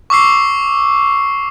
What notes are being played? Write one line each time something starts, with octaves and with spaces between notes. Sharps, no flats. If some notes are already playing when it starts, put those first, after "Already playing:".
C#6 D6 E6 C7